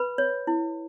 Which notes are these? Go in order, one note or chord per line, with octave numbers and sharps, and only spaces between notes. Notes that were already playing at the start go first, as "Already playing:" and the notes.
Already playing: B4 B5
C#5
E4